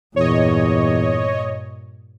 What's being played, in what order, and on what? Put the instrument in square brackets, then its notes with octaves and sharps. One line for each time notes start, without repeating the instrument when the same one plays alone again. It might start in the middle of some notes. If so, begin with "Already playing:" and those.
[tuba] E2 [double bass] G2 A#2 [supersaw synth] C#5 D#5